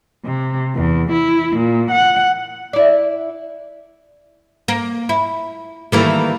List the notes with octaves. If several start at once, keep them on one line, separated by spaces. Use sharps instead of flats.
C3
E2
E4
A#2
F#5
E4 D5
A#3
E4
D#3 E3 G3 A3 A#3 E4